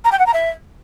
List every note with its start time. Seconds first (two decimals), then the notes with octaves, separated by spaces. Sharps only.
0.05 A#5
0.12 G5
0.19 F#5
0.26 A#5
0.34 E5